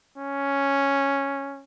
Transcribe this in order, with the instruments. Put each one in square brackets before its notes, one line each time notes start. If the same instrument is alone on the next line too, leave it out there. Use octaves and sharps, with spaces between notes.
[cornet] C#4